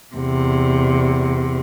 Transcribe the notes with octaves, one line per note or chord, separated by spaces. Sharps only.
E2 C3